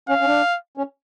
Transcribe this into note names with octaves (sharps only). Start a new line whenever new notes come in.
C#4 F5
C#4
D4
C#4